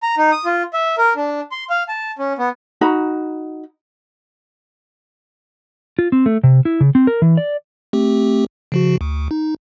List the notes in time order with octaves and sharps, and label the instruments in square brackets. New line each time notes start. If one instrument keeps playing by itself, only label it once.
[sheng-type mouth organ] A#5
D#4
D#6
F4
E5
A#4
D4
C6
F5
A5
C#4
B3
[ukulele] D#4 F#4 A#5 B5
[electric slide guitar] F4
C4
A3
C3
E4
C#3
C4
A#4
E3
D5
[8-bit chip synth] A3 C4 G4
C#3 F3 F#4
D2
D#4